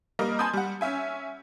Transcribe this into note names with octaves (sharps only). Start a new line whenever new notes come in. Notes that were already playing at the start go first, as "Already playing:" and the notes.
G3 A#3 D#5 F6
G#5 A5 B5 C6 D#6 G6
G3 F#5
C#4 E5 G#5